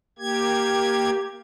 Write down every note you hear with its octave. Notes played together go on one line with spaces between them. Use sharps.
A#3 G4 G#6